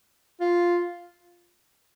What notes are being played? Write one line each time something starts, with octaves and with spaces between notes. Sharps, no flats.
F4